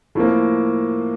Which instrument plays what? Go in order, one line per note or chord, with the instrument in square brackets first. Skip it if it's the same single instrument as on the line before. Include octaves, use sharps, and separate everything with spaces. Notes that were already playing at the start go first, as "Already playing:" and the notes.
[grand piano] A2 F3 A#3